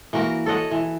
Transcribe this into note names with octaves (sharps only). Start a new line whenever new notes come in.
E3 A#3 F#4 A#4
A4 C#5 D#5 F#5
E3